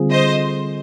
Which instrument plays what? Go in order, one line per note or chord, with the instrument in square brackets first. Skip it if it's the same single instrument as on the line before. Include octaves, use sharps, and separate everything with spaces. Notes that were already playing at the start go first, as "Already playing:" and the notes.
Already playing: [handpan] D3 G3 C4 F4 G#4
[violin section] C5 D#5